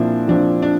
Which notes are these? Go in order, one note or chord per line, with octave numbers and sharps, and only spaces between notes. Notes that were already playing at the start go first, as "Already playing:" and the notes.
Already playing: A#2 F3 C4 D4 E4
F3 C4 D4
D4